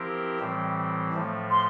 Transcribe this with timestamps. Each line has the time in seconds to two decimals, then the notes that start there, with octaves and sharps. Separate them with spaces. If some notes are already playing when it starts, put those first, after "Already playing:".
Already playing: F3 C4 E4 G4 A#4
0.39 A2 E3 G3 C4
1.13 A2 F3 A3
1.51 C6